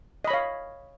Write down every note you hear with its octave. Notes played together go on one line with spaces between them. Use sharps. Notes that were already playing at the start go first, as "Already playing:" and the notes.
C#5 D#5 F5 B5